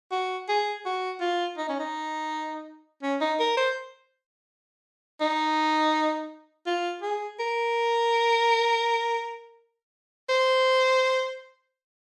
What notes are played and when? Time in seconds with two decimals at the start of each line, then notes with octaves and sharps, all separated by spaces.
0.12 F#4
0.49 G#4
0.85 F#4
1.21 F4
1.58 D#4
1.69 C#4
1.79 D#4
3.03 C#4
3.21 D#4
3.40 A#4
3.57 C5
5.21 D#4
6.67 F4
7.02 G#4
7.39 A#4
10.29 C5